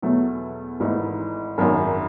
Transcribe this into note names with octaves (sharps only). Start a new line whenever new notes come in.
E2 B2 F#3 A3
G#1 G#2 E3 A3 D#4
G#1 F#2 D#3 F#3